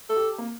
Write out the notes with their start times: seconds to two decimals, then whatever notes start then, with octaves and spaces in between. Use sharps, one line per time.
0.10 A4
0.16 G4
0.38 A#3